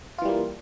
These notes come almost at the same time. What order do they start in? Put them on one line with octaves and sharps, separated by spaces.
F4 E3 G3 A#3